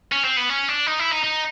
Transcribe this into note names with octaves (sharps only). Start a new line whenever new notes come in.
C#4
C4
B3
C#4
D4
D#4
E4
D#4
D#4